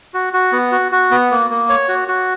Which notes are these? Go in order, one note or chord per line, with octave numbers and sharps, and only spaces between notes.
F#4
F#4
B3
F#4
F#4
B3
A#3
A#3
C#5
F#4
F#4